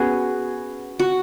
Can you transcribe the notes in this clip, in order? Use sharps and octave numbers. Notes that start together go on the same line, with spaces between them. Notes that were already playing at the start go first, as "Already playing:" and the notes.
Already playing: B3 C#4 F#4 G#4
F#4